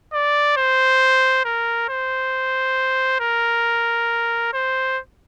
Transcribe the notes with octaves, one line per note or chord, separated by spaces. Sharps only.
D5
C5
A#4
C5
A#4
C5